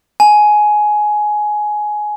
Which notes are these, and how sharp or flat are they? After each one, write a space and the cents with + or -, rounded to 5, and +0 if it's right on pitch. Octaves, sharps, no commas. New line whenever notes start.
G#5 +15